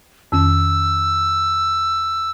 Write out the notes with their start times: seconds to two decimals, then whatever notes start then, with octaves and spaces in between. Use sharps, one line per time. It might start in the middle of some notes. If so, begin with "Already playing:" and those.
0.32 F2 D#3 C#4 E6